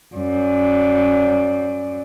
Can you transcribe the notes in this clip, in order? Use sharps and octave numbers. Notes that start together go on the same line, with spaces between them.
F#2 D5